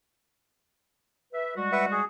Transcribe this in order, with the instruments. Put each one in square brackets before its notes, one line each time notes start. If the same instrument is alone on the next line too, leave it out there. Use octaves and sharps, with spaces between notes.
[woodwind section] B4 E5
G3 G#3 F#4
[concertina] B4 E5 F#5
G#4